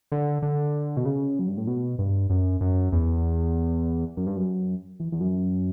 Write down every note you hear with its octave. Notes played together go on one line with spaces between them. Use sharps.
D3
D3
B2
C#3
F#2
G2
A2
B2
G2
F#2
F#2
E2
F#2
G2
F#2
E2
E2
F#2